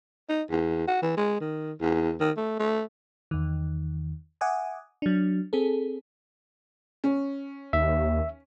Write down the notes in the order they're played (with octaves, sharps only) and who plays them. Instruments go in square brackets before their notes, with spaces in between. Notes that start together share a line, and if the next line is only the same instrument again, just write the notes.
[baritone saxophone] D#4
E2
F#4
E3
G#3
D#3
E2
D#3
A3
A3
[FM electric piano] E2 D#3
E5 F#5 G#5 D6 D#6
F#3 D4
C4 G#4 A4
[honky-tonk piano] C#4
[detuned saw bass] D#2 [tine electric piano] E5